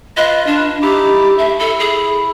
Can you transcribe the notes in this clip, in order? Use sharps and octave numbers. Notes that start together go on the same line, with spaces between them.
F4 B4 D#5
D4
D#4 E4 G4 D6
A3 E5
E4 A4
G#4